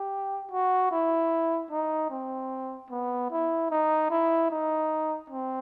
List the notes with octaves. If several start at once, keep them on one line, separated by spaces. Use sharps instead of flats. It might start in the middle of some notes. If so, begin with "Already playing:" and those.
Already playing: G4
F#4
E4
D#4
C4
B3
E4
D#4
E4
D#4
C4